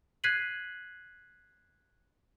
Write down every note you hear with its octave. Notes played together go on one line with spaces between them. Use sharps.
F#6 G#6 B6 C7 D#7 F#7